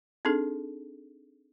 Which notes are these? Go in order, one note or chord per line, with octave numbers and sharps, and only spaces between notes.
C4 D4 D#4 G#4 A4